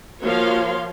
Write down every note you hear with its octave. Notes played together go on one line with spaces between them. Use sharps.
F3 A#3 F#4 C#5 F5 C6